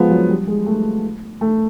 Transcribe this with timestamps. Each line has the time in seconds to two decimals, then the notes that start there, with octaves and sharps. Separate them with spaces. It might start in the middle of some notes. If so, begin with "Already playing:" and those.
Already playing: F3 G#3 B3
0.10 F#3
0.29 G3
0.47 G#3
0.66 A3
1.41 A3